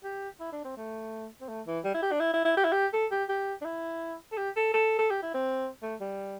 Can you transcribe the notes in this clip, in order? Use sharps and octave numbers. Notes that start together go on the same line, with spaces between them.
G4
E4
D4
C4
A3
C4
A3
E3
G3
E4
G4
D4
E4
E4
E4
G4
E4
G4
A4
G4
G4
D4
E4
A4
G4
A4
A4
A4
G4
E4
C4
A3
G3